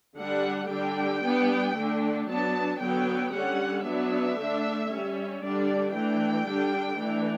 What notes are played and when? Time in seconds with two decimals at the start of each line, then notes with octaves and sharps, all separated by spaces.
0.17 D3 G3 D4 F#5
0.70 D3 G3 D4 G5
1.23 G3 B3 D4
1.75 D3 A3 D4
2.27 F#3 B3 D4 A5
2.80 D3 F#3 B3 G5
3.32 D3 G3 C#4 F#5
3.84 F#3 B3 D4 E5
4.37 D3 A3 D4
4.90 G3 C#4
5.42 D3 G3 D4 D5
5.93 E3 A3 D4 G5
6.46 D3 G3 D4
6.98 E3 A3 D4